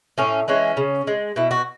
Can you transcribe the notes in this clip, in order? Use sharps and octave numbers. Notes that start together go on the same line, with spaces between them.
A2 C#4
E3 G#3 C#4
C#3
G#3
B2 E4
F#4